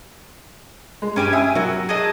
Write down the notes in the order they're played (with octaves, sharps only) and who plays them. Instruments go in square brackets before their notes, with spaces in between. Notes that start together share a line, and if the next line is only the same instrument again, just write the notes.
[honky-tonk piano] G#3
[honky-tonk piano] G2 [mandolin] C#4 G4 G#5
[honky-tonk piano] E5 G#5 E6 [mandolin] D#6
[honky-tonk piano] F#3 [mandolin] F#4 A#4
[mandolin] G#4 A4 D#5